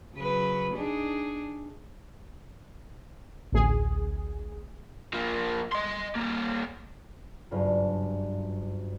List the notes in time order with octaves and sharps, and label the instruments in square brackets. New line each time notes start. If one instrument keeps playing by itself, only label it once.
[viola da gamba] C#3 F#3 B4
D4 D#4 G#4
[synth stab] A1 D2 G#4
[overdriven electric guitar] F3 A#3
D#5 C6
G3 A#3
[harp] F#1 G2 F4